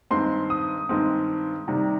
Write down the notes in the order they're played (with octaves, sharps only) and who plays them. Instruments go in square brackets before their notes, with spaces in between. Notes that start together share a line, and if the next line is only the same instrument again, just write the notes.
[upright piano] G2 D#3 G#3 C4 C6
D#6
G2 D#3 G#3 C4
C3 D#3 G3